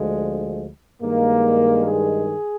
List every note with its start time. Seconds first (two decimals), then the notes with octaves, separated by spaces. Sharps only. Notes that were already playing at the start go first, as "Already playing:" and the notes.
Already playing: D2 D3 F3 G#3
1.02 G2 D#3 G#3 A#3
1.85 G#4